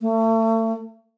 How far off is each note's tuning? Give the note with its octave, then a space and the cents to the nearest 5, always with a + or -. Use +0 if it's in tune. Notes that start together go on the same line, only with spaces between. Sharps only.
A3 +35